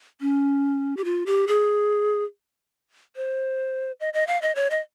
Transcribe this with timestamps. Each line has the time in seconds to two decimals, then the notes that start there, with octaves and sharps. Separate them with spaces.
0.21 C#4
0.97 G4
1.04 F4
1.26 G4
1.48 G#4
3.16 C5
4.00 D#5
4.14 D#5
4.27 F5
4.42 D#5
4.55 C#5
4.70 D#5